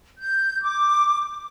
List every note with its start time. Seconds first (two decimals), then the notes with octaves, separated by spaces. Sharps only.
0.18 G6
0.62 D6